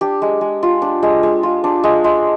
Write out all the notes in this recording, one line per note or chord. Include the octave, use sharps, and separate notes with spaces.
D4 G4
G#3
G#3
F4
D4
G#3
G#3
F4
D4
G#3
G#3